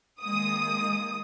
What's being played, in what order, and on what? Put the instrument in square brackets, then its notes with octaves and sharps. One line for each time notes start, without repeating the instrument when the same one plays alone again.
[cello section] D#3 G#3 A#3 [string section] D#6